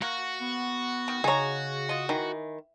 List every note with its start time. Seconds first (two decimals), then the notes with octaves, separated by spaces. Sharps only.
0.02 A#3 F#4
0.42 B3
1.08 D#3
1.24 C#3 D#4 G#4 C#5 A#5
1.89 F4 D#5
2.09 D#3 E3